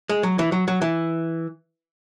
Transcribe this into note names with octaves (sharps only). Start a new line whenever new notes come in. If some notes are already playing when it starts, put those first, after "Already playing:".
G#3
F#3
E3
F#3
F#3
E3